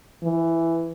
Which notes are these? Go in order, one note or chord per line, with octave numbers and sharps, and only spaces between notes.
E3